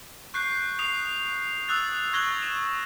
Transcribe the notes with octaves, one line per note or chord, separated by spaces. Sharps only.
C#6 F#6 G6 C7
D#6 C7 F7
D#6 E6 F#6 A6 F7
C#6 F#6 G#6 A#6 F#7 G7
E7